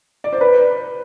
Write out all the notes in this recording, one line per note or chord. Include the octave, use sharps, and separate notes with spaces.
D5
C5
B4